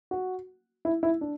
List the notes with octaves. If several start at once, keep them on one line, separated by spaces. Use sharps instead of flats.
F#4
E4
E4
D4